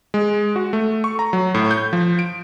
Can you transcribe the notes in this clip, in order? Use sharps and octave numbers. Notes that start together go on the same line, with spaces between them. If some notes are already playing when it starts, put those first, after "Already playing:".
G#3
F#4
A3
C#6
A#5
F#3
A2
G6
F3
D7